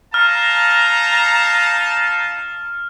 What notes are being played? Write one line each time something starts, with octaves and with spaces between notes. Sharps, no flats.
D#4 F5 A5 A#5 F6